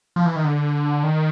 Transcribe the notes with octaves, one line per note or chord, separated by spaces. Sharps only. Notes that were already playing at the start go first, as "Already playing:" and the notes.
F3
E3
D#3
D3
D#3